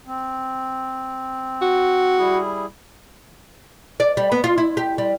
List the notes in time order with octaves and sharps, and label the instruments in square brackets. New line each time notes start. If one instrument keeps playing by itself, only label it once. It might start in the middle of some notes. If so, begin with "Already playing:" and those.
[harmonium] C4
[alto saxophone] F#4
[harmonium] G3 E4 G#4
[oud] D5
G3
B3
F4
E4
G4
G3